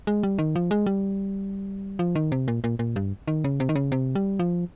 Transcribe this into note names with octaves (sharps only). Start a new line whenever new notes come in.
G#3
G3
D#3
F3
G#3
G3
F3
D#3
C3
A#2
A#2
A#2
G2
D#3
C#3
C3
D#3
C#3
C3
G3
F3